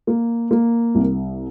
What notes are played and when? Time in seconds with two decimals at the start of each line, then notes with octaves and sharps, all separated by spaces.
0.07 A#3
0.51 A#3
0.95 C2